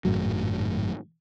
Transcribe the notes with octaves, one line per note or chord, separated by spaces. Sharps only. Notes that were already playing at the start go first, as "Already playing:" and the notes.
G#1 F#2 A2 F#3